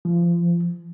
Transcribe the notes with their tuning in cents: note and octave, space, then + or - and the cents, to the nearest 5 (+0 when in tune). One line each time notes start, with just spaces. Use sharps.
F3 -30